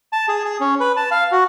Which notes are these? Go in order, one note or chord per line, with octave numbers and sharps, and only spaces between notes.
A5
G#4
G#4
C#4
B4
A5
F5
F#4